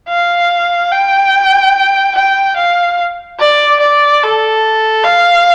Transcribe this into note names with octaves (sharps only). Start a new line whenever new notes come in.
F5
G5
G5
F5
D5
D5
A4
F5